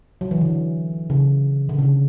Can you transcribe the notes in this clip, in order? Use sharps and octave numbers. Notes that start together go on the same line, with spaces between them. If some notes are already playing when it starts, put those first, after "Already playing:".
F#3
E3
D3
C#3
D3
C#3